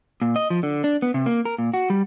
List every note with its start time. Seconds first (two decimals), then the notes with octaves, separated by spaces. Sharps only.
0.22 A#2
0.36 D#5
0.50 F3
0.63 D3
0.84 D4
1.02 B3
1.14 C3
1.26 A#3
1.45 A#4
1.58 A#2
1.74 F#4
1.90 G3